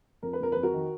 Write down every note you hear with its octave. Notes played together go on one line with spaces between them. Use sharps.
F2 A#4
B4
F2 A#4
F2 B4
F#4 A#4
D#3